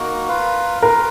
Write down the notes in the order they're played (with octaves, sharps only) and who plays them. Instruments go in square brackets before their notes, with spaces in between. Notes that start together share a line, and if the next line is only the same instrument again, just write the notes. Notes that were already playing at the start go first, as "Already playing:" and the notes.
Already playing: [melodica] A#3 D#4 F#4 [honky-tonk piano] A#4
[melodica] F4 B4 F5
[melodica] F4 B4 F5 [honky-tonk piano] A#4